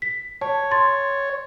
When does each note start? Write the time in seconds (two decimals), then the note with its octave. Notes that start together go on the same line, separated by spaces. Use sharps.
0.02 B6
0.41 C#5 A5
0.71 C6 A6